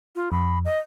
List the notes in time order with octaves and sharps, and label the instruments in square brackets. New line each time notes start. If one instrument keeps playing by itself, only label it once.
[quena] F4
[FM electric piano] F2 [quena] B5
[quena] D#5